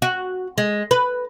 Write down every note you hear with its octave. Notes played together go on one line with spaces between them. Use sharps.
F#4
G#3
B4